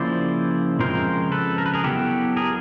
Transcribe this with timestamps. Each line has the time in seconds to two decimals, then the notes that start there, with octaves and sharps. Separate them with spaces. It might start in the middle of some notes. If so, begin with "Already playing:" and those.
Already playing: C#3 F3 A#3 C#4 E4 C5 D5
0.80 C#3 F3 G#3 C4 A#4 C5
1.32 A4 B4
1.58 A#4
1.66 B4
1.74 G#4 A#4
1.84 F#3 B3 E4 G4 A4
2.37 G#4 A#4